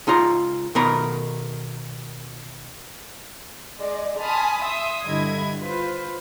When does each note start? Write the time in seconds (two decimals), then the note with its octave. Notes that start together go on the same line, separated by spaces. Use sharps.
0.07 C#2 D#4 F4 A#5
0.75 B2 D#3 A#4 B5
3.79 G#3 D5
4.21 G#5 A5 B5 C6 D#6 F6
4.63 E5 C6 D#6 E6
5.06 G2 D3 E4 D#5 G#6
5.63 F4 B4 C5